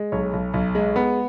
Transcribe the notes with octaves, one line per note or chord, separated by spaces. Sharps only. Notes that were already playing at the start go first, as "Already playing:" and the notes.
Already playing: G#3
B1 C#5
B1
B1
G#3
B3